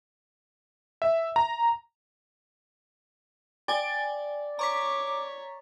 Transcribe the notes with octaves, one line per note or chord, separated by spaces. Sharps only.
E5
A#5
D5 G5 G#5
C#5 A#5 C#6 D6 B6